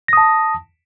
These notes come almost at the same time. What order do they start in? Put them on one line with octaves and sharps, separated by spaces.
A#6 D#6 A5